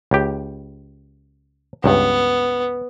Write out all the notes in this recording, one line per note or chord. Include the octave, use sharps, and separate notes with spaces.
C#2 G4
C#2 G2 B3